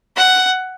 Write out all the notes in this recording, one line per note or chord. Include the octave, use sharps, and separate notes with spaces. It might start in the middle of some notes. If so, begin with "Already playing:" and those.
F#5